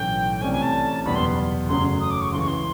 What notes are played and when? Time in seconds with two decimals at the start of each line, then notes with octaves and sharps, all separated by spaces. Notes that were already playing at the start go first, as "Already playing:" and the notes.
Already playing: B1 A2 E3 A3 C#4 G5
0.37 G5
0.41 C2 C3 E3 A3 C#4 G#5
0.52 G#5
0.62 A5
1.05 F#1 E2 B2 G3 B3 B5
1.15 C6
1.68 F#1 F#2 C#3 F#3 A3 C6
2.00 D#6
2.11 D6
2.21 C#6
2.32 C#2 C#3 E3 C6
2.39 C#6
2.48 C6